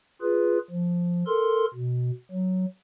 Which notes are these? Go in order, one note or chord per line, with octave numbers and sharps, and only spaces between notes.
F4 G#4 B4
F3
A4 A#4 C6
B2
F#3